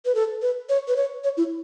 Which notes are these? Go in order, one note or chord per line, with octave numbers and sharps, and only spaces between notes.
B4
A4
B4
C#5
B4
C#5
C#5
E4